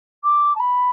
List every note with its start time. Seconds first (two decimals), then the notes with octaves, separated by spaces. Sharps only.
0.24 D6
0.55 A5
0.59 B5